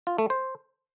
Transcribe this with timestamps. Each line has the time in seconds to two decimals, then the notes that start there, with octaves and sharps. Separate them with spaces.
0.07 F4
0.18 A3
0.30 C5